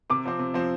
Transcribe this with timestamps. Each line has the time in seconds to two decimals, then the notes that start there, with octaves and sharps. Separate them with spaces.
0.10 C3 D6
0.25 F3 C4
0.39 C3
0.54 F3 C4